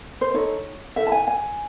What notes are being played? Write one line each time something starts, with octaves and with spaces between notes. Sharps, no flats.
C5
D#4 A4 C#5
E4 A4 E5
A5
G#5
G#5